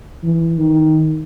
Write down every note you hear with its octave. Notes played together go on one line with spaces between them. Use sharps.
E3
D#3